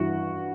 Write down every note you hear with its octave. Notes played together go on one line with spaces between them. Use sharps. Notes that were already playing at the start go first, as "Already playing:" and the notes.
Already playing: G2 E3 F#4